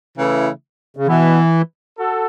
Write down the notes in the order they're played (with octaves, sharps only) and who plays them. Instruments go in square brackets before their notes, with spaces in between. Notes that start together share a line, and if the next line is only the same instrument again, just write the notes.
[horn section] C#3 E3 A3 E4
[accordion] C#3
[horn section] B2 B3 E4 [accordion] E3
[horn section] F#4 A4